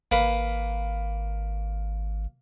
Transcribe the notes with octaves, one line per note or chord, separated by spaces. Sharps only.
G#1 A#3 B4